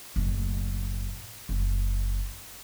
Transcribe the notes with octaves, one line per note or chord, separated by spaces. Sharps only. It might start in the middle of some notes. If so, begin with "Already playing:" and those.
F#1 A2
F#1